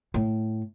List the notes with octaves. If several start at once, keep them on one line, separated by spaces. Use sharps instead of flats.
A2